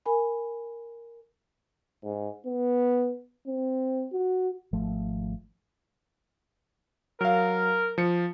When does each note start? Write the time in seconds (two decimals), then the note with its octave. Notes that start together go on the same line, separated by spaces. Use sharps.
0.06 A#4 G#5 B5
2.03 G#2
2.46 B3
3.47 C4
4.13 F#4
4.73 G#1 F3 A3
7.21 F#3 A#4 F5
7.98 F3 C#7